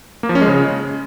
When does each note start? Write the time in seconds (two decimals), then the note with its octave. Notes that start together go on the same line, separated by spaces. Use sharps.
0.23 A#3
0.29 F3
0.35 C#4
0.41 G#3
0.47 C#3